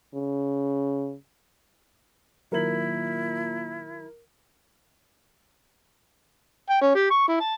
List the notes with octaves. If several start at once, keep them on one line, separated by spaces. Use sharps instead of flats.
C#3
A#2 D#3 F#3 E4 A#4 F#7
G5
C#4
G4
C#6
E4
A5